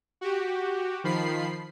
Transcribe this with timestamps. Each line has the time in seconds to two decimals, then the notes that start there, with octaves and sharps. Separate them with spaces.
0.21 F#4 G4
1.04 D#3 F3 B5 C7